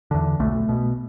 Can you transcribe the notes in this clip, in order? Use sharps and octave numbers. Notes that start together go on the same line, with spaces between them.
E2 D3
B1 A3
B2